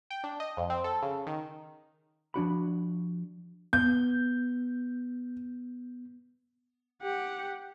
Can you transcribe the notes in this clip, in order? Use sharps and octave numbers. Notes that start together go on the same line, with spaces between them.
G5
D4
D#5
F2
C4
A4
C#3
D#3
F3 D4 F#4 B5
B3 G6
G4 F#5